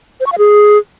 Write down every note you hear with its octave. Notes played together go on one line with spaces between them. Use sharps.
C5
C#6
F5
G#4